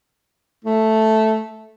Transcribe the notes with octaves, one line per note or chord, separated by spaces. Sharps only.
A3